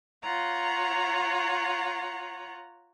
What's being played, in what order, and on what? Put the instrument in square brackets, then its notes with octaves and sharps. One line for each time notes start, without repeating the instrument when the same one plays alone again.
[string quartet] F4 C#5 F#5 A#5